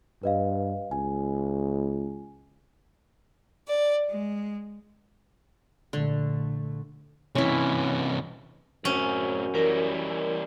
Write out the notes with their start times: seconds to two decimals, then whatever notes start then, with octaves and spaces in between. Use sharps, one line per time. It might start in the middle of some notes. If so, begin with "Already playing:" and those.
0.23 G2 B4 D#5 F5
0.91 C#2 G#5
3.67 D5
4.11 G#3
5.93 A#1 D3 A3
7.35 C3 E3 C#4 E4
8.85 F#2 A2 C4 C#4
9.55 E3 G3 A#4